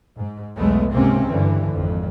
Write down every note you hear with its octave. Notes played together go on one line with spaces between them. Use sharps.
G#2
B1 E2 G#3 A3 B3
C#2 G#2 C3 A#3 C4 C#4
G2 D3 E3
G#1 F2